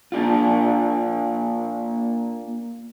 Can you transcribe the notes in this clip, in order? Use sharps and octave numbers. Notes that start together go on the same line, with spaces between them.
A#3 D4 F4